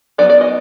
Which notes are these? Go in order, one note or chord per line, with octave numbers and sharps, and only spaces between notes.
F#3 B3 D#4 D5
D5
D#5